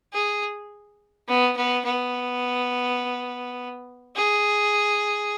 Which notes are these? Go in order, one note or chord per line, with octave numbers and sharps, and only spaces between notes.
G#4
B3
B3
B3
G#4